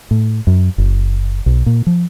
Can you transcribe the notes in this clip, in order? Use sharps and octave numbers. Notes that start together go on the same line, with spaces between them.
A2
F#2
F#1
B1
A#2
F3